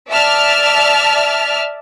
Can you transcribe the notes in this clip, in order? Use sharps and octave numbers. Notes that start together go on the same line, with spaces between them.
D5 E5 A5 F6